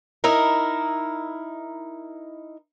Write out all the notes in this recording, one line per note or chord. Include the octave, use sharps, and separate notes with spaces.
D#4 E4 A#4